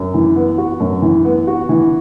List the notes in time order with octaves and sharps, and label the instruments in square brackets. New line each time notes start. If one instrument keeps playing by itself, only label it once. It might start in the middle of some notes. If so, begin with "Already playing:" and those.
Already playing: [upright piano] F#2
E3
B3
F#4
F#2
E3
B3
F#4
E3